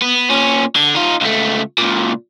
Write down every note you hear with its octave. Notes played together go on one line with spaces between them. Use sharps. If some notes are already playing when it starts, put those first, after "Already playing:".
B3
A#2 C#4
D3
D#4 F4
C#2 A3
C#2 A#2